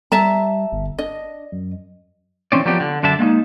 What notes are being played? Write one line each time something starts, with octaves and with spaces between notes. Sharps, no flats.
G3 E5 A5 A#5
G1
D4 D#5
F#2
E3 C4 C#4 D5
F3 F#3 B3 G4 D5
D3
F#2 D3 D4 E5 A5
G#3 A#3 C4 D#4